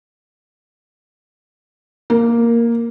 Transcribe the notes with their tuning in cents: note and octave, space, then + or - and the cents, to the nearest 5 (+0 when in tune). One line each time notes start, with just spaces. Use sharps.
A#3 +0